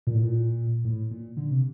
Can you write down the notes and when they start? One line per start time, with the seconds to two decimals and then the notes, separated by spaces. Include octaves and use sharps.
0.07 A#2
0.15 A2
0.23 A#2
0.85 A2
1.11 A#2
1.37 D3
1.51 C3